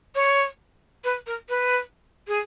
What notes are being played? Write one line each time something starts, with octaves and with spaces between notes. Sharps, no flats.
C#5
B4
A#4
B4
G#4